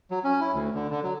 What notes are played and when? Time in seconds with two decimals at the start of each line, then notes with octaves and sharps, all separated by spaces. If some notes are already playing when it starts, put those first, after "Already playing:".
0.11 F#3
0.24 C#4
0.41 E4
0.54 D2
0.75 D3
0.90 D3
1.03 F#3